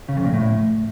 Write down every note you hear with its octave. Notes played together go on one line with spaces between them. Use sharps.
C#3
F2
A#2
A2